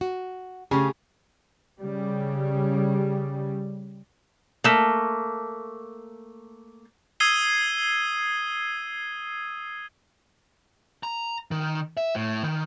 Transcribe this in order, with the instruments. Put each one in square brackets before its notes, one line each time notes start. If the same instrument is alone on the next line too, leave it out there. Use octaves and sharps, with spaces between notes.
[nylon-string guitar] F#4
[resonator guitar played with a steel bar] C#3 [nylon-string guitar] A3 G4 G#4
[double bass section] C#3 G3
[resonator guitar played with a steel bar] A3 A#3
[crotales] D#6 E6 G#6 C7 D#7 G7
[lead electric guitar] A#5
D#3
E5
A2
D#3